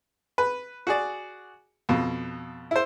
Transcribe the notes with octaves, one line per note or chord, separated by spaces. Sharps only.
B4
F#4 G#4 D5
F2 B2
E4 C5